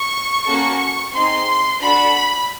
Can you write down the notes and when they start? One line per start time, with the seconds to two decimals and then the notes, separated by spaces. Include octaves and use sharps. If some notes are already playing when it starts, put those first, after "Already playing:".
Already playing: C#6
0.46 A#3 C#4 F#4 A4
1.12 C4 D#4 G#4 C6
1.80 D4 F#4 A4 B5